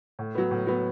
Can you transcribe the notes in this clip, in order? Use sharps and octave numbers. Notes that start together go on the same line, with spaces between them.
A2
F#3 B3
A2
F#3 B3